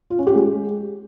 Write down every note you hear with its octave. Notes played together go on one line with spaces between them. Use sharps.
F4
C#4
G4
G#3